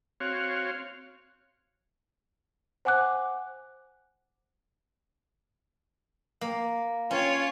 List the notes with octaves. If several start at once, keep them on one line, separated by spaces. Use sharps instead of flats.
C4 F#4 C#5 F5
C5 F#5 G#5 D6 F#6
A#3
C#4 F4 C#5